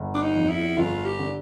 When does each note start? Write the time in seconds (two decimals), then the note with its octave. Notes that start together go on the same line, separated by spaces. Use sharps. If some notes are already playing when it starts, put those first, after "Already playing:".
Already playing: G1
0.14 D4
0.22 D#4
0.36 F2
0.49 E4
0.77 G1 F4
1.05 G4
1.19 D3